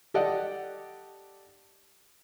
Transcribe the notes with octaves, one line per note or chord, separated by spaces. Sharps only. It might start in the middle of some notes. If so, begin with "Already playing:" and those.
G4 A4 D5 D#5 F#5